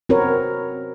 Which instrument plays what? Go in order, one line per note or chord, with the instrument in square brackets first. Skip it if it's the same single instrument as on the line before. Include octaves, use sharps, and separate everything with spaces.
[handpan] C4 F#4 A#4 B4 C#5